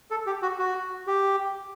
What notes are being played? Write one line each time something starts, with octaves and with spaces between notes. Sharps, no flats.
A4
G4
F#4
F#4
G4